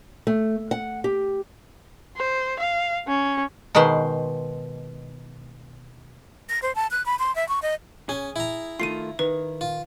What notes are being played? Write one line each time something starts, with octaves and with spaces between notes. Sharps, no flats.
A3
F#5
G4
C5
F5
C#4
B2 D#3 G#3 B4 C5
A#6
C5
A5
F#6
B5
C6
E5
C#6
D#5
C#4 G#4
E4 A#5
D#3 A3 F4 C7 D#7
D#3 B4
F4